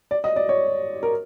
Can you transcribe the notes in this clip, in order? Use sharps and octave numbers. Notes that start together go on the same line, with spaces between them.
D5
D#5
D5
C#5
A#4